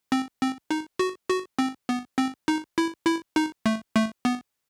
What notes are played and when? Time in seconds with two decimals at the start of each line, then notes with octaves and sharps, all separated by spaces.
0.12 C4
0.41 C4
0.71 D#4
0.99 F#4
1.30 F#4
1.59 C4
1.89 B3
2.18 C4
2.48 D#4
2.78 E4
3.06 E4
3.36 D#4
3.66 A3
3.96 A3
4.25 B3